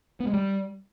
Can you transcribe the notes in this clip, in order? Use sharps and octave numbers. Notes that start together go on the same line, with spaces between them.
B3
G#3
G3